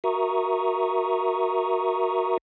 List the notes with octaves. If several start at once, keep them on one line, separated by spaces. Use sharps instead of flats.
F#4 A#4 E5 A#5 C#6 D#6